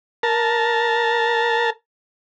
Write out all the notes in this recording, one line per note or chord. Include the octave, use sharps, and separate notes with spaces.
A#4 A5